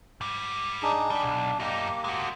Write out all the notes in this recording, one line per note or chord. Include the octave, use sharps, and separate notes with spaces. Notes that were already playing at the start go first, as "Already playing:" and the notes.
G#2 G3
D4 D#4 G#4
G3 D4
B1
F#2 A#3 D#4 G4
G#3 F#4